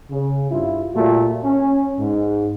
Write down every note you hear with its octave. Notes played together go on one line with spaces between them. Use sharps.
C#3
G2 E4 F4
A#2 G3 A3 F4 F#4
C#4
G#2